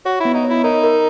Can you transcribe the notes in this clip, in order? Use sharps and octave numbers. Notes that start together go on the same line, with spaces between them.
F#4 C#5
B3 E4
D#4
C#5
E4
D#4 A#4
A#4